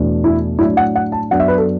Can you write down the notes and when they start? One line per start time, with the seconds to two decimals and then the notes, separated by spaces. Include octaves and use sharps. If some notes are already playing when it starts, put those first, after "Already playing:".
Already playing: E2 B2 A3 D4
0.24 E4
0.59 A2 F#3 D4 E4
0.77 F#5
0.95 F#5
1.12 A5
1.31 F#2 F#3 B3 D4 F#5
1.40 E5
1.48 B4
1.58 A4